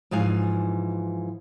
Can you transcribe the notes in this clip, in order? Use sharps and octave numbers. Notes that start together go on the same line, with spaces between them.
G#2 E3 F3 F5 G#5